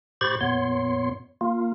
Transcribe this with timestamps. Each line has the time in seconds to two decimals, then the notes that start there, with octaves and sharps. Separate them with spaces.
0.21 A2 G4 C5 B5 C#6 A6
0.41 F2 A#2 B3 C#5 C6
1.41 A#3 F4